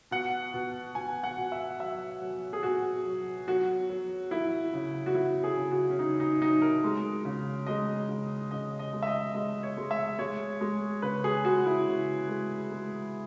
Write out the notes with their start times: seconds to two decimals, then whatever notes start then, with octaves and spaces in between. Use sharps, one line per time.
0.11 B2 F#5
0.54 B2
0.95 B2 G#5
1.24 F#5
1.38 B2
1.52 E5
1.79 F#3 E5
2.21 F#3
2.53 G#4
2.63 B2 F#4
3.05 F#3
3.48 F#3 F#4
3.89 F#3
4.31 F#3 E4
4.73 C#3
5.06 F#4
5.15 F#3 E4
5.44 G#4
5.57 C#3
5.71 F#4
5.90 C#4
5.99 C#3 D#4
6.20 D#4
6.41 F#3 D#4
6.62 A#4
6.84 G#3
7.25 C#3
7.66 G#3 D#5
8.09 C#3
8.51 C#3 D#5
8.79 D#5
8.93 G#3
9.03 E5
9.07 D#5
9.34 G#3 D#5
9.63 C#5
9.77 G#3
9.91 E5
10.19 G#3 C#5
10.61 G#3
11.02 C#3 B4
11.24 G#4
11.45 G#3 F#4
11.66 E4
11.87 C#3
12.28 G#3
12.71 G#3